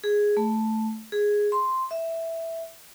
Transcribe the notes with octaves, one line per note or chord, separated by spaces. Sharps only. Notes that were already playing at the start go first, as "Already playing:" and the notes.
G#4
A3
G#4
C6
E5